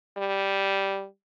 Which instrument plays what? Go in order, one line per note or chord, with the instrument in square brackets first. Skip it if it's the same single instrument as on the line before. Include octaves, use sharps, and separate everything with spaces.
[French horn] G3